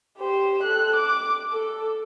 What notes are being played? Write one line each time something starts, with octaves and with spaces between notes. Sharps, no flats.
G4 C5
A4 F#6
D6
A4